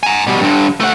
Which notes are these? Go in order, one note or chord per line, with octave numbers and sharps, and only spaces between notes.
G#5 A#5
B2 G3
G2 D3
A3 F#5